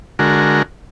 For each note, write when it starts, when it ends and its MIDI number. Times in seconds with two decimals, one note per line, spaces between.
0.19 0.62 50
0.19 0.62 56
0.19 0.62 66
0.19 0.62 70